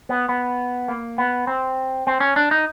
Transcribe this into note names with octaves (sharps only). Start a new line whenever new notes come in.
B3
B3
A#3
B3
C4
C4
C#4
D4
D#4